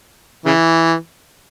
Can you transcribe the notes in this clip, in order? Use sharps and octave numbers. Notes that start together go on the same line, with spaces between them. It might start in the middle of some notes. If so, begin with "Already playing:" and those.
C#3 E3